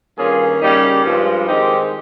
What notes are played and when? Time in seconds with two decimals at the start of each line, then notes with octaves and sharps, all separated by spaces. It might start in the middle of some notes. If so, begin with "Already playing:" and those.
0.18 G2 D#3 A#3 C#4 F4 G#4
0.61 C#3 G3 A#3 C#4 D#4 G4
1.04 G2 F3 G#3
1.47 D#3 G#3 C4 D#4 G4